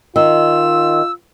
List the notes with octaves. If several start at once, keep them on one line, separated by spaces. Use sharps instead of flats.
D#3 F4 E6